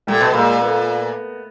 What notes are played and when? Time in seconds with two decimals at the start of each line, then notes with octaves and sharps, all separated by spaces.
0.07 A#2 G3 A3
0.20 B2
0.34 A#2 G#3 A#3
0.62 A3 B3